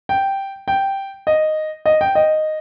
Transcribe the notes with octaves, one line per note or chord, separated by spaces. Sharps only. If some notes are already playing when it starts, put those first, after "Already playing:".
G5
G5
D#5
D#5
G5
D#5